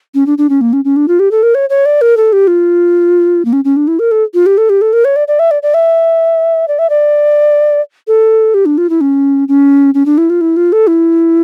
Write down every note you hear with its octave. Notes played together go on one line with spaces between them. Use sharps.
C#4
D4
D4
C#4
A#3
C#4
C#4
D4
F4
G4
A4
A#4
C#5
C#5
D5
A#4
A4
G4
F4
A#3
C#4
C#4
D4
E4
A#4
A4
F4
G4
A4
G4
A4
A#4
C#5
D5
D5
E5
D5
D5
E5
D5
E5
D5
A4
G4
D4
F4
E4
C#4
C#4
C#4
D4
E4
F4
E4
F4
A4
E4